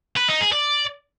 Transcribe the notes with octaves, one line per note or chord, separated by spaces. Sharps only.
B4
D#4
G#4
D5